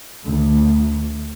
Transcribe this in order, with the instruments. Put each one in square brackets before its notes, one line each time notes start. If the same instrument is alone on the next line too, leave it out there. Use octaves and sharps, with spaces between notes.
[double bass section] D2